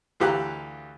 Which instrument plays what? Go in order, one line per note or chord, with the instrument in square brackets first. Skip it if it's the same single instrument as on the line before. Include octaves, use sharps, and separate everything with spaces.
[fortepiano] D2 E3 G4 F5 A#5 F#6